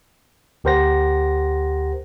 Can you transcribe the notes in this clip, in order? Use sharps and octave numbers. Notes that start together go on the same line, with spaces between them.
D2 G4 A#4 C5 F#5 A#6